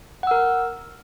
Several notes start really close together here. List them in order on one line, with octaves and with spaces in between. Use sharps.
F#5 E6 A#4